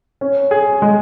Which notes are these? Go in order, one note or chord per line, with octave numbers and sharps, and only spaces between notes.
C#4
G#4
G#3